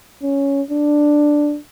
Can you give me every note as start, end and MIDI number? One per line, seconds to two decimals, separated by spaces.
0.23 0.62 61
0.71 1.57 62